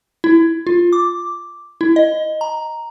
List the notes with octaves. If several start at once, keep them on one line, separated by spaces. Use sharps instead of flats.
E4
F4
D6
E4
D#5
A#5